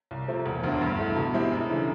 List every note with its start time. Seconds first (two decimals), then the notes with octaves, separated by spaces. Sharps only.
0.11 C2
0.28 C3 F3 A3 C4
0.46 E1
0.63 D2 D3
0.81 G2
0.99 E3 A3
1.16 B2
1.34 G#3 C4 E4 G4
1.52 F#2
1.69 C#3 E3 A3 D4